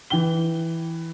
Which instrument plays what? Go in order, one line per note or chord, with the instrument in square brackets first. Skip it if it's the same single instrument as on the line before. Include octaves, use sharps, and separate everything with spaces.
[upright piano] E3 G5 G7